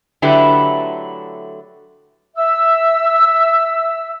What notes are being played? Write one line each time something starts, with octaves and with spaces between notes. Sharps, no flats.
D3 F#3 A3 E4 G4 B4
E5 E6